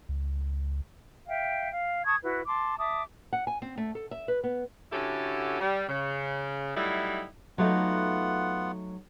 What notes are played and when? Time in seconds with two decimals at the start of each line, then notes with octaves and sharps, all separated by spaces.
0.09 C#2
1.28 E5 F5 G5
1.72 F5
2.05 A5 C#6 D#6 G#6
2.23 E4 F#4 B4
2.47 A5 C6 D6
2.78 E5 A5 D6 D#6
3.33 F#5
3.47 G#5
3.62 C4
3.78 A3
3.95 A4
4.11 E5
4.28 B4
4.44 B3
4.92 D3 C#4 E4 F#4 G4 A4
5.60 G3
5.88 C#3
6.76 F#3 G3 A3 D#4 E4
7.58 F#3 A3 B3 D#4 F4 F#5